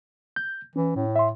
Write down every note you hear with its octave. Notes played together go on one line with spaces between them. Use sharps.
G6
E3 C#4
A2
E5 C6